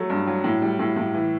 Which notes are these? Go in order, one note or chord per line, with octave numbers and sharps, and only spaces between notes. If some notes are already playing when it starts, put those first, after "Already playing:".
Already playing: F#3 A3
G2
F#3
A2
G3
A2
A2
E3